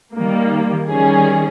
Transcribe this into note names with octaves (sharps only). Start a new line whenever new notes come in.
D#3 G3 A#3
D#3 G3 C#4 G#4